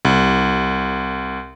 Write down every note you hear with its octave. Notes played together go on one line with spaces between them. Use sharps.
C2